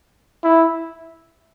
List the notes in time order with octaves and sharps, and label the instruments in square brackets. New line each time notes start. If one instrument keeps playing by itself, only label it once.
[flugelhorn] E4